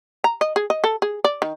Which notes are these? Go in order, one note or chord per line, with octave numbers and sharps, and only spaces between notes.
A#5
D#5
G#4
D#5
A4
G#4
D5
D#3